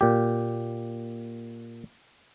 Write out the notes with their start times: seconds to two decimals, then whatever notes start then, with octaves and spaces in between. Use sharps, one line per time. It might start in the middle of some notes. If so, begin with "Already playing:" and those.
0.01 A#2 G4